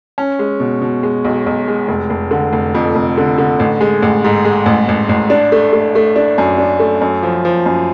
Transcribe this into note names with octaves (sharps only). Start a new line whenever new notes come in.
C#4
G#3
B2
B2
G#3
B1
B1
G#3
F1
F1
D3
F1
F2
F1
D3
D3
A1
G#3
A1
G#2
G#3
A1
A1
A1
D4
A3
A3
A3
D4
F#2
D4
A3
F#2
F3
F3
F#2